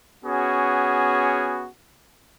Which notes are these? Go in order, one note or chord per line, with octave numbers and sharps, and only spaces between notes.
B3 C#4 F#4 G#4